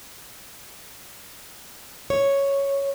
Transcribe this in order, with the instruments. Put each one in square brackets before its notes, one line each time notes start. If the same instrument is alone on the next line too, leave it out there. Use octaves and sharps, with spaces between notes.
[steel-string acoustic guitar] C#5